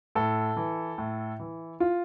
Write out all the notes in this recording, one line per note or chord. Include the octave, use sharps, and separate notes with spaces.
A2 A4
E3
A2
E3
F4